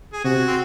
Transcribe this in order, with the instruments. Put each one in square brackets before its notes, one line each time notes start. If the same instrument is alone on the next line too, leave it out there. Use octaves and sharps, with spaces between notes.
[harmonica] G#4
[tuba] C3 [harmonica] F#4
[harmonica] C4